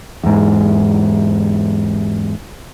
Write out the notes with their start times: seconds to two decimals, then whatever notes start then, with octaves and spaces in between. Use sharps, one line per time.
0.23 E2 G#2